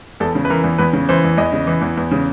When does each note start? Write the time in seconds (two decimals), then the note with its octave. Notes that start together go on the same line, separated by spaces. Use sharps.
0.20 E2 A4
0.35 C#3
0.45 B4
0.50 E3 A#4
0.64 E2
0.78 E2 B4
0.93 C#3
1.09 E3 C5
1.24 E2
1.37 E2 D#5
1.52 C#3
1.67 E3
1.81 E2
1.97 E2
2.11 C#3